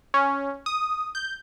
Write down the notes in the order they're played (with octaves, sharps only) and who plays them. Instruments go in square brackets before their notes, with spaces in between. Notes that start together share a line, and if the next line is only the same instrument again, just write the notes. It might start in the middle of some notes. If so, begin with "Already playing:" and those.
[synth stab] C#4
D#6
G6